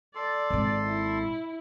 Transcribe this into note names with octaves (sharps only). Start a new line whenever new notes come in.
A4 D5 C6
G#1 A#2
E4